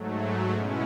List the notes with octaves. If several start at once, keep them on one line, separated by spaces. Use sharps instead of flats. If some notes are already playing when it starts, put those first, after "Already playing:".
Already playing: G#2 F#3 A3
B2 G#3 C#4 E4